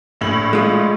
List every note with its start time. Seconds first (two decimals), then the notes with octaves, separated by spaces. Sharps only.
0.21 A#1 A2 F#7
0.53 G#3 F4